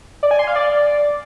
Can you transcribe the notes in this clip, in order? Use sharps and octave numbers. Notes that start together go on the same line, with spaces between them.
D5
G#5
C6
F5
D5